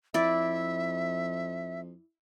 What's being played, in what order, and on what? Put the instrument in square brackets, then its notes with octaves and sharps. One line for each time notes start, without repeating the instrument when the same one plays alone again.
[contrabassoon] F2 [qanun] E4 D5 [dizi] E5